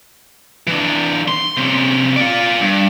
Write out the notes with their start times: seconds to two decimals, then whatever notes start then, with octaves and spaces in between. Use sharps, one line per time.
0.67 E3 D4
1.28 C6
1.57 C3 C#4
2.17 F4 D5
2.61 G2